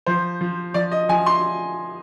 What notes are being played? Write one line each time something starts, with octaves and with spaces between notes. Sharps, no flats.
F3 C5
F3
F3 D5
D#5
F3 G#5
C6